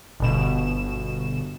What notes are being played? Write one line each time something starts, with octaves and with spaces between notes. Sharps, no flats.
G1 B2 E7